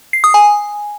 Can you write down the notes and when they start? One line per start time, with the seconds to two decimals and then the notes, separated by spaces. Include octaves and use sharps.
0.13 C7
0.24 D#6
0.34 G#5